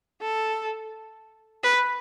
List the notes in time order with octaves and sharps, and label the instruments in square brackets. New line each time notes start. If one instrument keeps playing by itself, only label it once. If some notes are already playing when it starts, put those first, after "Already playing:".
[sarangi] A4
B4